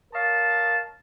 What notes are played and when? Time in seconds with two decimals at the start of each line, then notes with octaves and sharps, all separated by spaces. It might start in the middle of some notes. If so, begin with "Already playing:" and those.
0.12 A#4 C#5 D#5 F5 A5